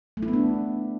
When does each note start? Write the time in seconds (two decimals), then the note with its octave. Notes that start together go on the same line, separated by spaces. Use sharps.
0.17 A3
0.23 E4
0.28 B3
0.33 D4